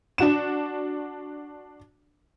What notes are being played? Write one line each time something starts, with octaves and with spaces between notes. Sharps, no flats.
D4 F#4 E7